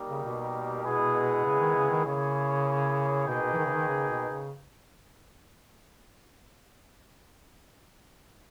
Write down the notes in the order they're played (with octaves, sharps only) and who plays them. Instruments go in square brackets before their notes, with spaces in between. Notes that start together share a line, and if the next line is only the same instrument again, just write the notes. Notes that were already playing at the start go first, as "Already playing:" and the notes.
Already playing: [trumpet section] G3 A#3 D#4 G4 A#4
[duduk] C#3
B2
[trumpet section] G#3 B3 E4 G#4
[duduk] C#3
D#3
C#3
D#3
[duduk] C#3 [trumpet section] A#3 E4 G#4 C#5
[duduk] B2 [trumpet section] A#3 D#4 G#4 B4 G5
[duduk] B2
E3
D#3
C#3
D#3
C#3
B2
C#3